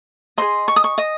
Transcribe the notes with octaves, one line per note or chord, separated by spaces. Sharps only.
G#4 C5 D#5 C6
C#6
D#6
C#6
D#5